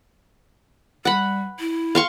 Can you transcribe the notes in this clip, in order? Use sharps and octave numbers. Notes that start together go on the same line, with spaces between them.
G3 F#5 B5
E4
F5 C6 C#6